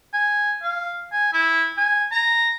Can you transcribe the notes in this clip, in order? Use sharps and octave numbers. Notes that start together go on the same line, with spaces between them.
G#5
F5
G#5
E4
G#5
A#5